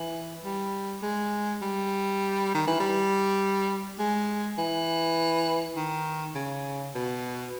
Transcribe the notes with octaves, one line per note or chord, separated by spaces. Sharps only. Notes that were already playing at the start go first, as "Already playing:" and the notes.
Already playing: E3
G3
G#3
G3
D#3
E3
G3
G#3
E3
D#3
C#3
B2